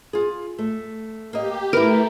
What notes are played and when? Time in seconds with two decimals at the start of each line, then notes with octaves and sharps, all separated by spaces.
0.13 F4 G#4
0.59 A3
1.33 A#3 G4 D#5
1.73 A3 E4 A#4 B4